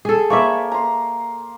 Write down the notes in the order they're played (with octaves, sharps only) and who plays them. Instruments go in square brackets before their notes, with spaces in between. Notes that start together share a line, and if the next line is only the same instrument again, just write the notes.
[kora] G#4 A4
[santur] A#3 B4 [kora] C#5 D5 E5
[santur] A#5 C6